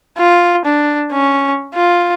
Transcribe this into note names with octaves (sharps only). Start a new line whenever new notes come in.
F4
D4
C#4
F4